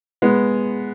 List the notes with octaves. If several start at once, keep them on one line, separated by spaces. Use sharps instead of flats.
G#3 B3